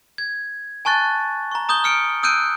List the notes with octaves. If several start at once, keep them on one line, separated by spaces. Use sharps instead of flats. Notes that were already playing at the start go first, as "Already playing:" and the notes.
G#6
G#5 A5 C#6 F#6 A6
A#5 C#6
A#5 D#6 G6 G7
F6 C#7 D7
D#6 E6 F#6 G6 D7 D#7